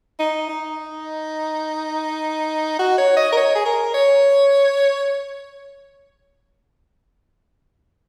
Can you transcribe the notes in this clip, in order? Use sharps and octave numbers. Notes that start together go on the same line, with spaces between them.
D#4
D#4
F#4
C#5
D#5
A#4
C#5
G#4
A#4
C#5